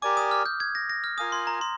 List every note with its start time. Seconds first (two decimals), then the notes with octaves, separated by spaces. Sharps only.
0.02 G4 A#4 D5 G#5 D6
0.17 D#6
0.31 F6
0.46 G6
0.60 G#6
0.75 A#6
0.89 A#6
1.04 F6
1.18 F4 A#4 F5 G#5 D#6
1.32 C6
1.47 A#5
1.61 C6